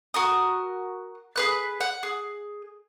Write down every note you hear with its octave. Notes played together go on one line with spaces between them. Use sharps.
F#4 A#4 D#6
G#4 B4 F#6
F#5
G#4